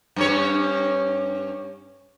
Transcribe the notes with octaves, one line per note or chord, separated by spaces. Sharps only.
G2 C#4 C#5